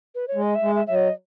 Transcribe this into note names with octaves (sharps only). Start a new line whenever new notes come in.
B4
C#5
G#3
D#5
E5
G#3
E5
F#3 E5
D#5